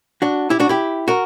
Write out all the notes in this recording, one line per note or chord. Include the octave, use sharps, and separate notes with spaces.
D4 F#4
E4 G4
D4 F#4
E4 G4
F#4 A#4